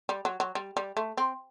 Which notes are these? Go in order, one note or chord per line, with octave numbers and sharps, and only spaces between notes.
G3
F#3
F#3
G3
G3
A3
C4